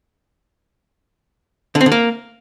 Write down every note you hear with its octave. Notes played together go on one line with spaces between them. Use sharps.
D3
C4
D3
A#3